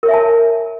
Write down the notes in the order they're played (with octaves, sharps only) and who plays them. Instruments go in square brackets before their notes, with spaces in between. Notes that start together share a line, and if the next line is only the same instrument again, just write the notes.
[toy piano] A#4
C#5
E5
G#5
A5